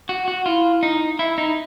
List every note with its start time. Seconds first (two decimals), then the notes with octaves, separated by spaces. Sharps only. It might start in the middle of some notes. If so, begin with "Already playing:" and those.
0.09 F#4
0.28 F#4
0.46 E4 F4
0.83 D#4
1.19 E4
1.38 D#4